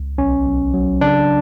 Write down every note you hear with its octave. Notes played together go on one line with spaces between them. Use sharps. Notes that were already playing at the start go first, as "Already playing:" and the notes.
Already playing: C#2
B1 C#4
B1
F#3
C#3 D4